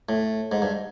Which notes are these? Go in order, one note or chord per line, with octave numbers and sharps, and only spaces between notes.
A2
G#2
G2